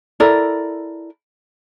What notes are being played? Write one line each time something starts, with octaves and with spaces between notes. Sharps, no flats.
E4 A4 A#4 D5